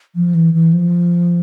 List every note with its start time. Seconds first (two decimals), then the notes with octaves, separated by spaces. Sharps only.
0.15 F3
0.35 E3
0.54 E3
0.73 F3